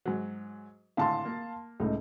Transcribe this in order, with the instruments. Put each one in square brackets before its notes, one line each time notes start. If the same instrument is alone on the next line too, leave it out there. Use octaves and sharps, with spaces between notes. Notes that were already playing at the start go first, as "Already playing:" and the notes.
[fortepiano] G#2 F#3
[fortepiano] G#1 A2 D3 [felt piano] F5 A5 C6
[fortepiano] A#3
[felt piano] C#2 A2 [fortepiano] D#4